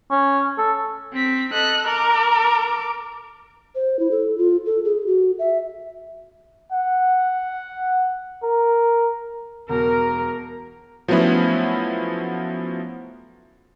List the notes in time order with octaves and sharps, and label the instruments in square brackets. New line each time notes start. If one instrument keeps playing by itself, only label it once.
[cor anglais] C#4
A4
[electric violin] C4 B6
[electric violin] A4 D#5 [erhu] F#6
[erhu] A#4 [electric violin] D6
[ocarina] C5
E4
A4
F4
A4
G#4
F#4
E5
[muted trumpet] F#5
A#4
[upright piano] E1 [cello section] A#4
[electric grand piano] F3 F#3 A3 B3 C#4 E4